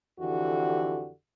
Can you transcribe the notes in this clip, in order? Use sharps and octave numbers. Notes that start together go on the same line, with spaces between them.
F2 D3 E3 F#4 G4